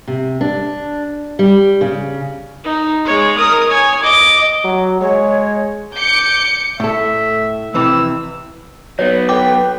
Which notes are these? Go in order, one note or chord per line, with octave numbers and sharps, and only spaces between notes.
C3
D4
G3
C#3
D#4
G#3 C#5
A#4 D#6
C#5 G#5
D#5 D6
F#3
G#3 C#5
D6 G6 C#7
A2 A4 E5
F2 C3 E3 E6
F#3 B3 B4 C#5
A4 G5 D6